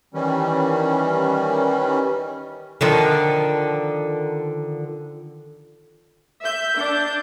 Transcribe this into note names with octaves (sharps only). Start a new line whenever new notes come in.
D#3 E3 G3 C#4
D3 D#3 F3
E5 G6
D4